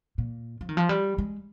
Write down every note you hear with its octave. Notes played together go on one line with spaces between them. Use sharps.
A#2
F3
D#3
F3
G3
G#3